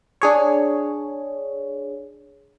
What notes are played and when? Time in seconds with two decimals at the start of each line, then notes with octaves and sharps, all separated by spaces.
0.22 D4 G#4 C#5